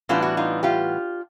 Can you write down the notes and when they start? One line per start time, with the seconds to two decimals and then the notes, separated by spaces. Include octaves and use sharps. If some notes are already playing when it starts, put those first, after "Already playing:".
0.09 A2 E3 G3 B3 D4 F4
0.22 F#4
0.37 D#4 F4
0.63 F4 G4